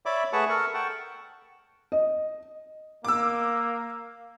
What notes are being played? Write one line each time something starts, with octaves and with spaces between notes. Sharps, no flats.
C#5 D5 E5 B5 D6
A3 G#4 B4 F#5 A5 C#6
A4 A#4 C#6
F#5 G5 A5 C#6
D#5
A#3 D6 E6